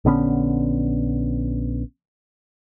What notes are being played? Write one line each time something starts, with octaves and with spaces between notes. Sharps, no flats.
A#1 D3 B3 C#4